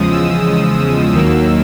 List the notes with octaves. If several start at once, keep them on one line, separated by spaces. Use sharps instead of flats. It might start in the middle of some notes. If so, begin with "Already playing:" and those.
Already playing: E2 C#3 F3 G#3 D#6
E6
D#2 D#3 F#3 A#3 E6